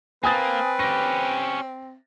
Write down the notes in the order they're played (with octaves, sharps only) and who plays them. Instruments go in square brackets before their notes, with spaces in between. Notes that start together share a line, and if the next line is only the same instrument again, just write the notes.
[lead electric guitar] A#3 [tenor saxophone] C4 [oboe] B4 [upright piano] G#5 D#6 A6
[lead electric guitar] C#4 G4 [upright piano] A#6